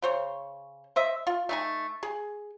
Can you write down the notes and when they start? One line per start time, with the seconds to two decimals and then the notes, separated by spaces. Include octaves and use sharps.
0.02 C#3 C5 C#5
0.96 C5 D#5 E5
1.27 F4
1.49 A3 D#4 G#5
2.03 G#4